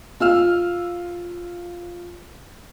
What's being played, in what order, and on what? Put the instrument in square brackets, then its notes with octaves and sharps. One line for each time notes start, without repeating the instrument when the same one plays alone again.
[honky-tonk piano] F4 E6 F6